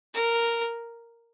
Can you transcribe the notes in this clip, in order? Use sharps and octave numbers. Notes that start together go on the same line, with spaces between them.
A#4